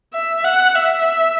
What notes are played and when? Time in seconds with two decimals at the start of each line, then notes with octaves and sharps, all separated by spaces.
0.14 E5
0.44 F#5
0.75 E5